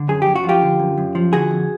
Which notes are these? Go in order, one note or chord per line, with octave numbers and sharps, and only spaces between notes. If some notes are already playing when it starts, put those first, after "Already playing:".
Already playing: D3
F#2 G#4
F#2 G4
F#4
F3
F4 G4
D3
F#2
F#2
F3
D3 F#4 G#4
F2